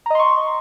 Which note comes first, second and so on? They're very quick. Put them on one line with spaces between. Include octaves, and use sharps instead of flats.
A#5 D#5 C6 C#6